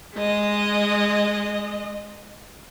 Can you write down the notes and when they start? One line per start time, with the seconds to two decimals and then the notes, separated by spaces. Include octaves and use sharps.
0.16 G#3 D#5